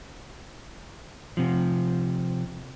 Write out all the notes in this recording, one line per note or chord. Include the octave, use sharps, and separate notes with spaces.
C3 F3